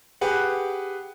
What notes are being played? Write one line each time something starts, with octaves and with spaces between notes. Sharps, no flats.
G4 G#4 B4 F#5